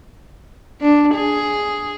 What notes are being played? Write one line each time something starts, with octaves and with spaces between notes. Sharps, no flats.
D4
G#4